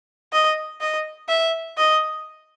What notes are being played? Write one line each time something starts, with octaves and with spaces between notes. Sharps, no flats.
D#5
D#5
E5
D#5